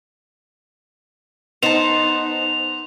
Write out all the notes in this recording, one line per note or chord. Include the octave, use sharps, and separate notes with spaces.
B3 D#4 C5 A5 F7